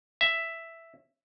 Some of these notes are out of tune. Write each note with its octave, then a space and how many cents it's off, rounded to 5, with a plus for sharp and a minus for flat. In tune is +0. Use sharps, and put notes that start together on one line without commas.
E5 +5